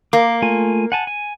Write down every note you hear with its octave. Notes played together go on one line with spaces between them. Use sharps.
A#3 D6
A3 F4 G#5
F#5 G#5 A5
G#5